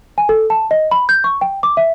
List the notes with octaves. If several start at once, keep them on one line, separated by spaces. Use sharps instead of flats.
G#5
A4
A5
D#5
B5
G6
C#6
G5
D6
E5